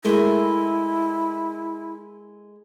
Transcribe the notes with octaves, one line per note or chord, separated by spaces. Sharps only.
G#3 A3 E4 A#4